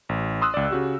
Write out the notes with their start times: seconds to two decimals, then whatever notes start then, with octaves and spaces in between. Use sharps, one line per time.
0.09 A1
0.42 C6 D#6 E6 F#6
0.54 C#2 D5
0.71 C#3 F#4 G4